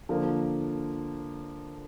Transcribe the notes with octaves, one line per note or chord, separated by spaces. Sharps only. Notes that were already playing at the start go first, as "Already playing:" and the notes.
D3 F3 A#3